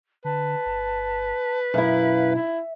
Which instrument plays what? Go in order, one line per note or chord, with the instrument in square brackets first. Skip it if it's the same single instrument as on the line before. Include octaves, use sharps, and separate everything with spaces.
[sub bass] D3 [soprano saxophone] B4 [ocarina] A5
[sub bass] G1
[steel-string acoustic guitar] F#2 E4 [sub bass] B2 [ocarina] F5
[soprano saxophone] E4 [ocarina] E5